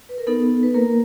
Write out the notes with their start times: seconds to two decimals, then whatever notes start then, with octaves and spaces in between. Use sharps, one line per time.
0.09 B4
0.18 A#4
0.27 B3 D#4 A4
0.63 B4
0.74 A#3 A#4